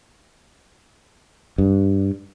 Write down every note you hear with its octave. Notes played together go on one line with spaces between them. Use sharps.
G2